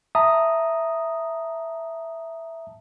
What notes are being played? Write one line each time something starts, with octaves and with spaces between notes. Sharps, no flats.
E5 A5 A#5 D#6